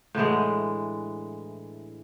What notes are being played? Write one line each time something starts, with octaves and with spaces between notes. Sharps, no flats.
A2 D3 E3 G#3